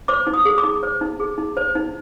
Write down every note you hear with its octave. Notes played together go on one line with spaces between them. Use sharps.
C5 D6
D#4
D#6
G#4
D6
D#4
C5
D#4
G#4
D#4
C5
D#4